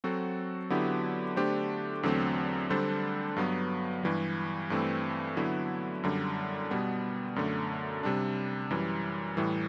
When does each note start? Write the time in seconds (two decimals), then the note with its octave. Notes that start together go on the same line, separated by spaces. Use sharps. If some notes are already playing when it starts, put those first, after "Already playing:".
0.04 F#3 C4 F#4 A4
0.70 D3 F#3 B3 E4 G4
1.36 D3 A3 D4 G4 C5
2.03 E2 D3 F#3 A3 C4
2.70 D3 G3 D4 A4 C5
3.36 G2 F#3 B3
4.03 G2 E3 G3
4.70 G2 E3 A3 C4
5.37 D3 F#3 B3 E4
6.03 F#2 D3 G3
6.70 B2 G3 B3
7.36 F#2 D3 A3
8.03 C3 G3 D4
8.70 F#2 E3 G3
9.37 A2 E3 G3